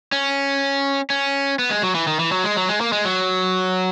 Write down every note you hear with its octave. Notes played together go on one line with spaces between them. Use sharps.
C#4
C#4
B3
G#3
F#3
E3
D#3
E3
F#3
G#3
F#3
G#3
A#3
G#3
F#3